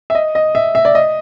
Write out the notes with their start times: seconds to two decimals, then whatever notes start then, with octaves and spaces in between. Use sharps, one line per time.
0.10 E5
0.15 D#5
0.35 D#5
0.55 E5
0.75 E5
0.85 D5
0.95 D#5